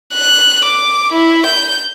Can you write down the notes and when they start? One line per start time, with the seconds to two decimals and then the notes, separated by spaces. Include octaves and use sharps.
0.14 F#6
0.65 D6
1.13 E4
1.46 G6